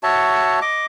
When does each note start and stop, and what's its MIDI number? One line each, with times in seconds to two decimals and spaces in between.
0.03 0.60 66
0.03 0.60 73
0.03 0.60 76
0.03 0.60 81
0.62 0.86 75
0.62 0.86 86